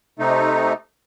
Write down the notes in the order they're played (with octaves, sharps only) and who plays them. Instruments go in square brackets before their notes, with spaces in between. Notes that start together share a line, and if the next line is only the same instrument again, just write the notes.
[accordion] C3 A3 D#4